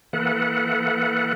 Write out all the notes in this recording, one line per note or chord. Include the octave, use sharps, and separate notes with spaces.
E3 A#3 A4 B4 F#5